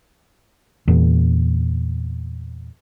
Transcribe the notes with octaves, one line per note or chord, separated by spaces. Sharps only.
E2 A#2